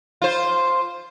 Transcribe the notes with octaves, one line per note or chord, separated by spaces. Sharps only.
F4 C5